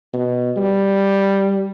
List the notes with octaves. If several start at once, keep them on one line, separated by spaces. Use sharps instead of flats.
B2
G3